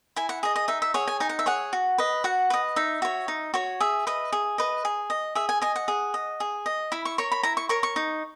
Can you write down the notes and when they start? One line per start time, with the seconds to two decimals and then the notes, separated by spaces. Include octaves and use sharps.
0.16 E4 G#5
0.29 F#5
0.43 G#4 D#5
0.56 D#5
0.68 D#4 E5
0.82 E5
0.94 G#4 C#5 F#5
1.07 G#5
1.20 D#4 G#5
1.29 F#5
1.39 E5
1.46 G#4 C#5 F#5
1.73 F#4
1.98 B4 D#5
2.24 F#4 F#5
2.50 B4 D#5
2.76 D#4 E5
3.02 F#4 C#5
3.28 D#4
3.54 F#4 C#5
3.80 G#4 E5
4.07 B4 D#5
4.32 G#4
4.58 B4 D#5
4.85 G#4
5.10 D#5
5.35 G#4 E5
5.49 G#5
5.61 D#5 G#5
5.76 F#5
5.88 G#4
6.14 D#5
6.40 G#4
6.66 D#5
6.92 E4 B5
7.05 C#6
7.18 A#4 C#5 C#6
7.32 B5
7.43 E4 A#5
7.57 C#6
7.69 A#4 C#5 C#6
7.83 C#6
7.96 D#4